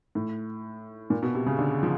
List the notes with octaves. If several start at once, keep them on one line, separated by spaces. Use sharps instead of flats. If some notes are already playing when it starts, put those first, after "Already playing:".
A2
A#2
B2
C3
C#3
D3
F3